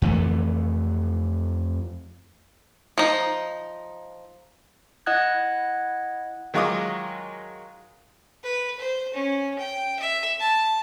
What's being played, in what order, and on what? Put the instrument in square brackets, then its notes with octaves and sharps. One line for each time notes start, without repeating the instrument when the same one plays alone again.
[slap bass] F2 E3 A3
[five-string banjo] F3 D#4
[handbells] E4 D#5 F#5 D#6 F#6 G#6
[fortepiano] D#3 F#3 G#3 F4 D6 D#6
[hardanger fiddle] B4
C5
C#4
G5
E5
A5